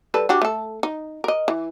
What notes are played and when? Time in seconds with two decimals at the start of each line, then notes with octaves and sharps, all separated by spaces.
0.14 G3 A4 B4
0.29 D4 F#4 G4
0.42 A3 A4
0.83 D#4
1.24 A#4 D#5
1.48 E3